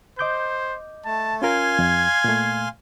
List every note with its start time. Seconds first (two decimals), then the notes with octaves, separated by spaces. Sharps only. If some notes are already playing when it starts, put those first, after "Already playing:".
0.19 C5 D#5 D6 G6
1.06 A3 A5
1.42 C#4 F4 A#4 F5 G#5 C6 G#6
1.79 F2
2.24 A#2 A3